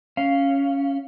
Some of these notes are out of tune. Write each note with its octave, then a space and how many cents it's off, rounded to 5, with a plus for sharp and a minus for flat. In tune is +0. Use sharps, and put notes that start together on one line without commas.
C#4 +0 F5 -10